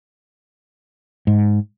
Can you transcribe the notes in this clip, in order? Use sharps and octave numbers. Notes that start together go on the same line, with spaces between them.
G#2